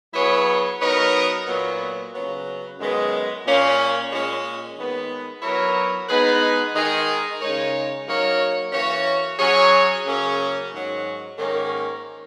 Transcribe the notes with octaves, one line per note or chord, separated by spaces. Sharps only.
F#3 B3 E4 G#4 C#5
F#3 B3 D#4 A#4 C#5
A#2 F#3 B3
C#3 F#3 B3
F#2 D#3 G#3 B3
A#2 A#3 C#4
A#2 G#3 C#4
D#3 G#3 B3
F#3 B3 E4 A#4 C#5
G#3 B3 D#4 G#4 B4
D#3 G#3 D#4 G#4
C#3 G#3 D#4 A#4 C#5
F#3 A#3 D#4 A#4 C#5
E3 A#3 C#4 F#4 C#5
F#3 C#4 G#4 C#5
C#3 F#3 A#3 C#4 G#4
G#2 D#3 F#3
G#2 D#3 A#3 C#4